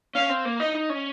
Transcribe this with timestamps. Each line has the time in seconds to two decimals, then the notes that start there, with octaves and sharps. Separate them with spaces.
0.15 C#4 F5
0.29 C4
0.45 A#3
0.60 D#4 D#5
0.75 D#4
0.90 C#4